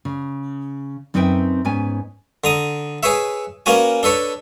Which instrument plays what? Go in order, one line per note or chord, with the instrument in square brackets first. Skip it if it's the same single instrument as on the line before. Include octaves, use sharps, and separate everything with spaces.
[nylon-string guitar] C#3
F#2 C4 D#4 B4 E5 G5
G#2 B3 C#4 G#5
[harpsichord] D3 A#5 D#6
G#4 B4 C#5 E5
A#3 B3 C#4 F#4 G#5
D4 A4 B4 C#5